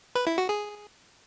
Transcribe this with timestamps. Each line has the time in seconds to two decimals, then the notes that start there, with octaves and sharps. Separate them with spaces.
0.15 B4
0.27 E4
0.38 F#4
0.49 G#4